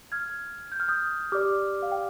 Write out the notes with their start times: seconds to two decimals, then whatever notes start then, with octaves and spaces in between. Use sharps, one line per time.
0.12 F6 G#6
0.72 G6
0.80 F6
0.88 D#6 G6
1.32 G4 D5 D6 F6
1.82 F5
1.92 G5